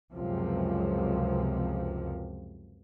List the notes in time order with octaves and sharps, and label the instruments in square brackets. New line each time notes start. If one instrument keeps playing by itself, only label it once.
[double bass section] C#2 F#2 C3 F3